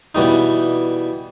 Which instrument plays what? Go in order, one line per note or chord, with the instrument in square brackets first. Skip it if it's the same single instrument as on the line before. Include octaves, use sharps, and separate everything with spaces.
[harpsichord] B2 E3 G3 D#4